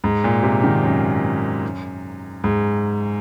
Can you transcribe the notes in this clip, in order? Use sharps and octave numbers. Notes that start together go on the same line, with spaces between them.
G#2
A#2
C3
D#3
F#2
G#2